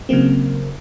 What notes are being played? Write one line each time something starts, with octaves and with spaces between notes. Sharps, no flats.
C#3 F#3 A#3 C4